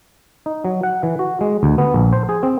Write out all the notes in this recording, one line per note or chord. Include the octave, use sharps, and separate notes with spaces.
D#4
F#3
F#5
E3
F#4
G#3
D2
B3
A#1
C5
G#4
C4